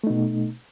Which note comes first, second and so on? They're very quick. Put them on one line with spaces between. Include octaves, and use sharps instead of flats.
A3 D#4 B2